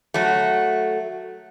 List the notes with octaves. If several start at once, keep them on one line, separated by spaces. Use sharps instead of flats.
F#3 A3